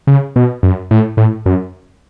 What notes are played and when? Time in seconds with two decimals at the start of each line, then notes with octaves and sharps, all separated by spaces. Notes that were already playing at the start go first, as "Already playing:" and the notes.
0.07 C#3
0.36 B2
0.63 F#2
0.91 A2
1.17 A2
1.46 F#2